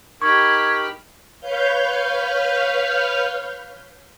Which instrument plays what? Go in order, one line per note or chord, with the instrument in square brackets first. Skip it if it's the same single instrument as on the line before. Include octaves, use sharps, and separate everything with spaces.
[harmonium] D#4 A#4 [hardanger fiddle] G4 B5 [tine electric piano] C#6 [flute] G#6
[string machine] B4 C#5 F5 F6 G6